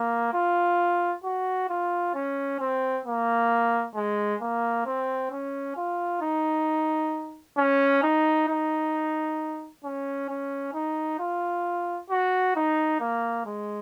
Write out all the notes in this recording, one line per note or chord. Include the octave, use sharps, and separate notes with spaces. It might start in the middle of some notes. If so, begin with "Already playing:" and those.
Already playing: A#3
F4
F#4
F4
C#4
C4
A#3
G#3
A#3
C4
C#4
F4
D#4
C#4
D#4
D#4
C#4
C#4
D#4
F4
F#4
D#4
A#3
G#3